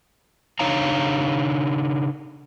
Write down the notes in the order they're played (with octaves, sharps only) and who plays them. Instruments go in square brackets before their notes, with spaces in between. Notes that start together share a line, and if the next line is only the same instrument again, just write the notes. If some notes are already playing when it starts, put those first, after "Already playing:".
[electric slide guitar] C#3 D4 D#4 C#5 F5 A#5